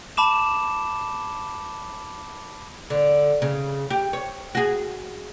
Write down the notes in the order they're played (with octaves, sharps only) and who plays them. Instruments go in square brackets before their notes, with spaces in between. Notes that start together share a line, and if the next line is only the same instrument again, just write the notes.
[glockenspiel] A5 B5 D6 E7
[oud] D3
C#3
G4
C#5
F#4 G#4